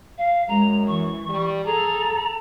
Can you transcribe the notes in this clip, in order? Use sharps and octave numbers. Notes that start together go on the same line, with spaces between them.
F5
F#2 G#3 A#5
E3 C#6
G3
G#4 A4 A#5